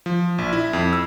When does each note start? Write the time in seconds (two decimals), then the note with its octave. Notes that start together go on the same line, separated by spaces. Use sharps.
0.06 F3
0.38 A#1
0.53 E4
0.73 F2
0.93 E6